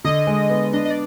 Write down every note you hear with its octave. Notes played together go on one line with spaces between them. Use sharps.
D3 D#5
G#3
B3
D4 D#5
D#5
D5